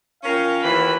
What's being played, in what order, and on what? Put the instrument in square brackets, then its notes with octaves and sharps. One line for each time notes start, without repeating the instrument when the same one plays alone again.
[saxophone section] C#4 A#4 [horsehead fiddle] F4 G5 [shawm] F5
[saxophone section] D#2 E3 [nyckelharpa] B5